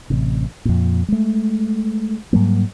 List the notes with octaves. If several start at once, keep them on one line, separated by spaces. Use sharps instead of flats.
A1 C3
F2 A#2
G#3 A3
G#2 F#3 G3 A#3